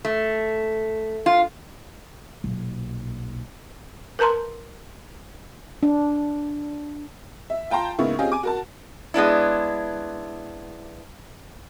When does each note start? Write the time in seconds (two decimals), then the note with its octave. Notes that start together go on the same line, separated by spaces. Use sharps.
0.05 A3
1.26 F4
2.44 B1 A#2
4.19 A#4 B4 A5 A#5 C6
5.83 D4
7.50 E5
7.70 F4 G5 A5 A#5 C6
7.99 G#2 C#3 A#3 B3 E4 C#6
8.19 C4 C#4 F4 G4 G#4 D#5
8.32 G#5 D6
8.43 F#4 A#4 A5
9.14 G#3 B3 D4 E4